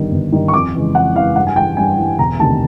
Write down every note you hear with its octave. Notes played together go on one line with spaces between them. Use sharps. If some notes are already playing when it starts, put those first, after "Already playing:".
Already playing: G1 G2 D#3
G1
G2 D#3
C#6
F2 D6
C#3 E3 G#3
F2 F#5
C#3 E3 G#3 F5
G2 F#5
G#5
E3 G3 G5
G2 G#5
E3 G3
E1 A#5
D2 C3 D#3 A5